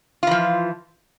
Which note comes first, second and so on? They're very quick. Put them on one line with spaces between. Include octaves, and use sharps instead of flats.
F4 E3 F3